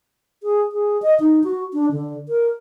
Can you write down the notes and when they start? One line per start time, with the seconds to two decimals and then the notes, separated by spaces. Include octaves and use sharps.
0.43 G#4
0.72 G#4
1.02 D#5
1.20 D#4
1.44 F#4
1.73 D4
1.91 D3
2.29 A#4